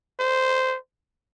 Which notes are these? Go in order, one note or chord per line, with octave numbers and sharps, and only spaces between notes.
C5